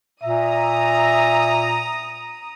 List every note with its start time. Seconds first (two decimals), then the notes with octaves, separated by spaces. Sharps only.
0.23 A#2 E5 A#5 D#6